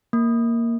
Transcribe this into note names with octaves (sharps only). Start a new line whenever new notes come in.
A#3